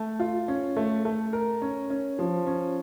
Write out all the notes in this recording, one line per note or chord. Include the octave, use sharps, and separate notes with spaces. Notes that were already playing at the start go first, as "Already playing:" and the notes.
Already playing: A3
F4
C#4
A3
A3
A#4
C#4
C#4
F3
C#4